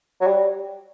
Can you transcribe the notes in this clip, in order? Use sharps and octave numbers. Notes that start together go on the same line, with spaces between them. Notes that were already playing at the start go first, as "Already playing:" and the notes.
F#3
G3